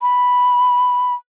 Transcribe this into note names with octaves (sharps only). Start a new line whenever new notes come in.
B5